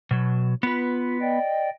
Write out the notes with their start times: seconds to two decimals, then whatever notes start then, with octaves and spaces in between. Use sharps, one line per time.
0.11 B2 F#3
0.63 B3 F4 B4
1.21 D5 D#5 G5